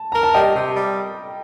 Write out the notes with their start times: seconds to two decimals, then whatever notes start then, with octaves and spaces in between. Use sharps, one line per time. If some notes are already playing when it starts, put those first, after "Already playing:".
Already playing: A5
0.12 A#4 A#5
0.23 A5
0.34 G3 D#5 G5
0.54 C3
0.74 G3